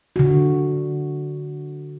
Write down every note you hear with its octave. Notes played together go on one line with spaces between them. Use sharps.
D3 F#4